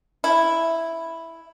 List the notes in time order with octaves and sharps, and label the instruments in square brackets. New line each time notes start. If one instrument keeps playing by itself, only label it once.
[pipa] E4